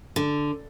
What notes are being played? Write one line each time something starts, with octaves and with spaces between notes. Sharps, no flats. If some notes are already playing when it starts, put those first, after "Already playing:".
D3